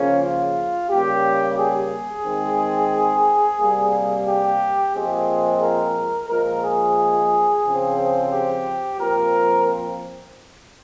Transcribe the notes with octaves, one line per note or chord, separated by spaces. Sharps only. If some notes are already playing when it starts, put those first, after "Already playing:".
Already playing: C#3 F3 A#3 C#4
F4
C#3 G3 A#3 G4
G#4
D#3 G#3 C4
C3 G3 A#3
G4
A#2 F3 G#3 C4 G#4
A#4
A#2 F3 G#3 A#4
G#4
C#3 F3 C4
G4
A#2 F3 C4 A#4